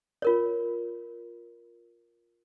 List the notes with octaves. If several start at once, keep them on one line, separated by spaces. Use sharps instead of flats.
F4 A#4 C#5